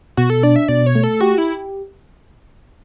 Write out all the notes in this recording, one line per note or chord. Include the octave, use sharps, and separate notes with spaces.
B2 F#4
A4
D4 D5
E5
B2 D5
C#5
A3
A4
F#4 G4
E4